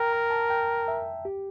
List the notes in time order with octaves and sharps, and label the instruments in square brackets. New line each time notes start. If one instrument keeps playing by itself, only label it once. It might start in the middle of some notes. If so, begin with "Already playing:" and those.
Already playing: [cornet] A#4 [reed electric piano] G5
[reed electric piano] A#5
A5
G5
E5
G4